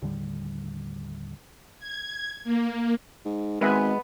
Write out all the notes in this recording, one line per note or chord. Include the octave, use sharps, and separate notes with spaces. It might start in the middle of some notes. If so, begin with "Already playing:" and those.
D#2 A2 D3 G3
G#6
A#3
G#2
G#1 G#3 B3 B4 E5 G#5